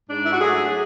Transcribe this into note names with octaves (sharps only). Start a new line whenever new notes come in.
G#2 D4
E4
F#4
F#3 A3 G#4